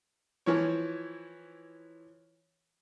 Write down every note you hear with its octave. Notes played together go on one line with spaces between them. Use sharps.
E3 F3 C#5